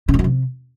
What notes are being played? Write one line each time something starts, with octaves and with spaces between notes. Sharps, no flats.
C#3
G#2
F#2
C3